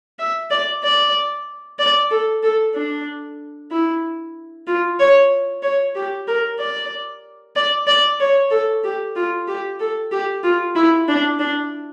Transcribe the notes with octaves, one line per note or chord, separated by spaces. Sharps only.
E5
D5
D5
D5
A4
A4
D4
E4
F4
C#5
C#5
G4
A#4
D5
D5
D5
C#5
A4
G4
F4
G4
A4
G4
F4
E4
D4
D4